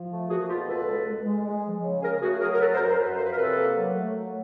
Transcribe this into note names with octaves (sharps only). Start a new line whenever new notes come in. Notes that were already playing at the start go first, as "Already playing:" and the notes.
Already playing: F3
A3
A#3 F#4 G#4
B2 F4 G4
C#2 A4 B4
G#3
G#3
G#3
G#3
F3
C#3
C#3 G#4 A#4
A3 F#4 G#4
F#3 G#4 A#4
A#4
F#2 A4 B4
A#4 C5
F#2
A#4 C5
F#2 A4 B4
F3 C5
B4
A#4
C3 A4 B4
A#3
F#3
A3
F#3